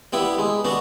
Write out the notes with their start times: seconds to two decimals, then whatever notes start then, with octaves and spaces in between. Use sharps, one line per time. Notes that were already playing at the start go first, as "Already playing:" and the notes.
0.13 G3 B3 E4
0.38 G#3
0.65 B3 D4 F#4